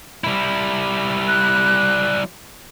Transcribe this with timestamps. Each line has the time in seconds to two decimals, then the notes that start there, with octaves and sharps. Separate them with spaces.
0.24 G3 E4
1.28 F#6